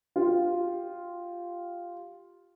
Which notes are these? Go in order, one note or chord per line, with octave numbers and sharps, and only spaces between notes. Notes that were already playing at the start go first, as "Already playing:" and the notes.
F4 G4